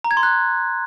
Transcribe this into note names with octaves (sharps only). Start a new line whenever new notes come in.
A#5
G#6
C6
F#6